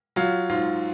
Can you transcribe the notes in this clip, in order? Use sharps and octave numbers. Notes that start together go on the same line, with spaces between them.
F#3 F4
G#2 F4